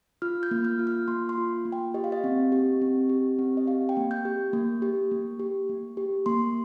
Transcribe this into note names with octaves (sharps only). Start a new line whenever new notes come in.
F4 F6
G6
A#3
F6
F4
F6
A#3 C6
C6
F4
A#3
G5
G4 D#5
F5
D#5
C4
G4
C4
G4
C4
D#5
G4 F5
G5
A#3
G6
G4
A#3
G4
A#3
G4
A#3
G4
A#3 C6